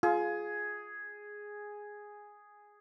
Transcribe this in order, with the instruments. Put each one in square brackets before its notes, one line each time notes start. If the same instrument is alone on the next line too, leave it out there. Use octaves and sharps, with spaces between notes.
[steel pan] F4 [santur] G#4